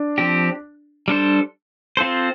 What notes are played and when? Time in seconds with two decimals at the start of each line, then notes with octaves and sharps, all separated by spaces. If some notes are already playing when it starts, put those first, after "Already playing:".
Already playing: D4
0.18 F3 C4 G4
1.08 G3 D4 A4 C5
1.97 C4 F4 A4 C5